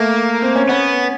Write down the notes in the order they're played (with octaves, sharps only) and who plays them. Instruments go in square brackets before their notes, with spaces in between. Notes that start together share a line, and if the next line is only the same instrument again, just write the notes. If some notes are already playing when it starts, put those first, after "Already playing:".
Already playing: [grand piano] A3 [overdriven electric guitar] A#3
[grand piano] C4
C#4
[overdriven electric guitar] B3 [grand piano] C#4